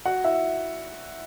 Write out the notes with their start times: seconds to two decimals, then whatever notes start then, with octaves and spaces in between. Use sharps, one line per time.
0.06 F#4 F#5
0.24 E4 E5